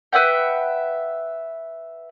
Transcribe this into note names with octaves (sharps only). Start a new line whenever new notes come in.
B4 E5 F#5 G5